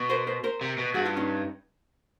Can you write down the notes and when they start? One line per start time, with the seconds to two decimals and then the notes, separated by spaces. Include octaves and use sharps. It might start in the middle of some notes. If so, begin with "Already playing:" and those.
Already playing: B2
0.10 A#4 C5
0.27 A#4 C5
0.44 A#4 C5
0.61 C3
0.78 B2
0.94 G2 F#4 G#4
1.06 F4 G4
1.17 C#4 D#4